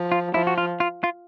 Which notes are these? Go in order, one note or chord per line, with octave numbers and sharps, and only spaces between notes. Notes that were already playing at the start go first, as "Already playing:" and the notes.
Already playing: F3
F4
F3 E4
F#4
F4
F4
F4